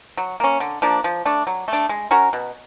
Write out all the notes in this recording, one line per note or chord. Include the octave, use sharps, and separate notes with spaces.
F#3
A#3 C#4
D3
F3 A#3 D4
F3
A3 D4
F#3
A3 D4
G#3
C#4 F#4 A#4
B2